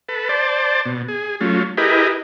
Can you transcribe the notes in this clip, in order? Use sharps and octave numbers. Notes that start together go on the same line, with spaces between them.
A4 B4
C5 D5 A5
B2
G#4
F#3 A3 C#4 F4
E4 G4 G#4 A#4 B4 D#5